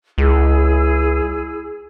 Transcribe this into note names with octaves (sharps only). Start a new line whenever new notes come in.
C#2 E4 G#4 E6